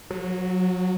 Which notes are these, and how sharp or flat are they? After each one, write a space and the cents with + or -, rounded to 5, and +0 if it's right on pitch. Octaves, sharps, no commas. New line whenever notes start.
F#3 -20